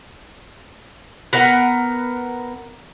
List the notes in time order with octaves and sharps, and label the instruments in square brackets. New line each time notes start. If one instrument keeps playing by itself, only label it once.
[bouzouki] B3 A#4 F#5